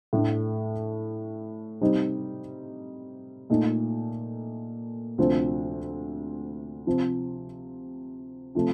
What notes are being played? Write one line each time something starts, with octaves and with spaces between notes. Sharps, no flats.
A2 A3 D4
C3 G3 C4 D#4
A#2 A3 D#4
D2 C3 F3 C4
C3 F3 C4
C3 F3 A3